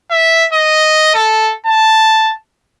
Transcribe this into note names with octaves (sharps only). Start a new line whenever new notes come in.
E5
D#5
A4
A5